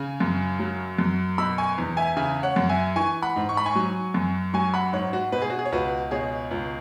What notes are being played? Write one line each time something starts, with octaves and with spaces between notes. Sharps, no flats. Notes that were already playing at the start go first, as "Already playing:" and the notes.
Already playing: C#3 G#5
F#2
F#3
F#2
B2 B5 E6
G#5 C#6
E2
E5 G#5
C#3 E5 G#5
C#5 F#5
F#2
E5 G#5
E3 G#5 C#6
F#5 B5
G#2
C#6
B5
G#5 C#6
F#3
F#2
F#3 G#5 C#6
F#5 B5
G#2 C#5 F#5
F#4
B2 B4
G#4
F#4
G#4
C#5
C#2 F#4 B4
B2 G#4 C#5
C#2